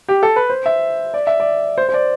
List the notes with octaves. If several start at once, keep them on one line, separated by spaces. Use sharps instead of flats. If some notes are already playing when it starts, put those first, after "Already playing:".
G4
A4
B4
C5
E5
D5
E5
D5
C5
C5
D5